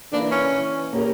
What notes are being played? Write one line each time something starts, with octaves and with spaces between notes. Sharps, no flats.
E3 A#3 D4 E4
C#4
E3
A#3 C#4 G4 A#4